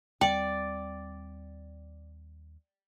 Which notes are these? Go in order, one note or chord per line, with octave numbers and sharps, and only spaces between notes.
D#2 G3 C4 D5 G5